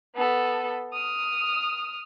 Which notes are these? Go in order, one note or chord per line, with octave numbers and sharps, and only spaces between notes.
B3 A4
D#6 F6